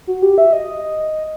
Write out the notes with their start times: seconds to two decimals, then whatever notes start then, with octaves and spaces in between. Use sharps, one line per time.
0.07 F#4
0.22 G4
0.38 E5
0.53 D#5